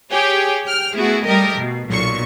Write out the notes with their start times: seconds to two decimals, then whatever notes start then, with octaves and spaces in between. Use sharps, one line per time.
0.12 G4 G#4 C#5 G5
0.65 G5 F6
0.96 A3 B3 E4 F#4 G#4
1.27 G3 A3 G4 A#4 D#5
1.58 B2
1.90 B1 A#2 C#6